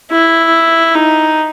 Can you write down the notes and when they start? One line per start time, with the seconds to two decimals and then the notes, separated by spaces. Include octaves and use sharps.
0.11 E4
0.95 D#4